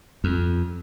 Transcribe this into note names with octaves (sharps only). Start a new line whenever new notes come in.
F2